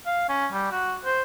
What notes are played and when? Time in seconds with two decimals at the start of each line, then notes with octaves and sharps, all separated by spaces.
0.06 F5
0.29 C#4
0.52 G3
0.71 F#4
1.05 C5